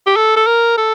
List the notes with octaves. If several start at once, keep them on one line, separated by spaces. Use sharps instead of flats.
G4
A4
A4
A#4
A4